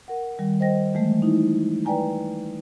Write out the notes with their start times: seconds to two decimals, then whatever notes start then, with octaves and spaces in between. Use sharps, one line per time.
0.08 A#4 F#5
0.39 D#3 G3
0.60 C5 D#5 G5 A#6
0.94 E3 G#3 A3
1.22 D#4 E4
1.85 B4 D5 G5 G#5 A#5